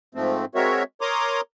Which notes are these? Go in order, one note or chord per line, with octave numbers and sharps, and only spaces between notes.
G#2 F3 A3 C4
G#3 C4 F#4 A#4 C#5 E5
A#4 C#5 A#5 C6 D6 D#6